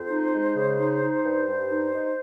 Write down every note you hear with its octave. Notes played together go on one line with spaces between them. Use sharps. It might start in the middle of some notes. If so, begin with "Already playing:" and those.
Already playing: F2 C5
D#4
G#3
C#3
D#4
D#4
G2
G2
D#4
D#4